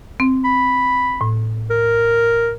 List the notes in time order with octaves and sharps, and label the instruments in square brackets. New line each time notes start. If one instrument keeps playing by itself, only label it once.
[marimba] C4
[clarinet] B5
[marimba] A2
[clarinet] A#4